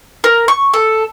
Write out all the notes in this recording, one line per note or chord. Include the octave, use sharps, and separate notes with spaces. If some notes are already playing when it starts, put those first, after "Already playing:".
A#4
C#6
A4